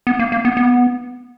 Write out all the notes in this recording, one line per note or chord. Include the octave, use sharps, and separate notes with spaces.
B3
A#3
A#3
B3
B3